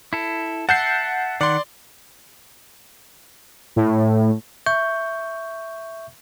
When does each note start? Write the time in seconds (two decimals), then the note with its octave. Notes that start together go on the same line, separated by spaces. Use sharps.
0.13 E4 A4
0.69 E5 F#5 A5 G6 C7
1.41 D#3 D5 F#5 C6
3.76 A2
4.66 E5 C#6 G6